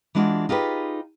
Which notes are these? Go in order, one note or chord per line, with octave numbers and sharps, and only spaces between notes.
E3 G#3 D4 F4 F#4
D#4 F4 G4 G#4 B4